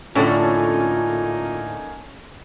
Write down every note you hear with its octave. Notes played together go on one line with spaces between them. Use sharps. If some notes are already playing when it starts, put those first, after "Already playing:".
A2 D3 A#3 C#4 D#4 F4 A4 G#5